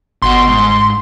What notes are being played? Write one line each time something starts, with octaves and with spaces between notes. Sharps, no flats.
G1 B2 F#4 C6
G#2